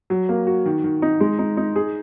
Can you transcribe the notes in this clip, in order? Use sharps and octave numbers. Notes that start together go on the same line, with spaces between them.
F#3
A#3
F#4
D#3
D#3
D#4
G#3
D#4
D#4
G#4